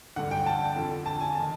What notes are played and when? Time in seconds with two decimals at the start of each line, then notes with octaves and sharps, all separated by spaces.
0.16 G2 D3 F#5
0.31 G5
0.46 A5
0.76 F2 D3
1.06 A5
1.21 G#5
1.35 D#3 A5